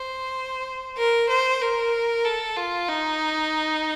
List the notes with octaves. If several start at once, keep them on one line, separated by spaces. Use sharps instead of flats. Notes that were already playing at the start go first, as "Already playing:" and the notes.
Already playing: C5
A#4
C5
A#4
A4
F4
D#4